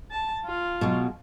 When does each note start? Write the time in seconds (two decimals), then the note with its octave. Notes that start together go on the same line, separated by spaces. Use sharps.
0.11 A5
0.45 F4
0.81 B2 F#3 G#3